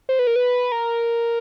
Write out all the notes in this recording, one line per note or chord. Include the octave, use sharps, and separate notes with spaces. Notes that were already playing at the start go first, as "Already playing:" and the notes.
C5
B4
A#4
B4
A#4